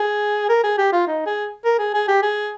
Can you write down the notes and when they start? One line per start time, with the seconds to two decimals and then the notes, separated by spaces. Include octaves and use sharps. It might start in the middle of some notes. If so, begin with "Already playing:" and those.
Already playing: G#4
0.49 A#4
0.63 G#4
0.78 G4
0.92 F4
1.07 D#4
1.26 G#4
1.64 A#4
1.78 G#4
1.94 G#4
2.08 G4
2.22 G#4